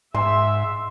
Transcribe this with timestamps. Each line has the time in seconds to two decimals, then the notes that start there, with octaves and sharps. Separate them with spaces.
0.15 G#2 E5 C6